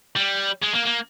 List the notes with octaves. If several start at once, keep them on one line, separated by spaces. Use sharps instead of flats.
G3
G#3
A#3
A#3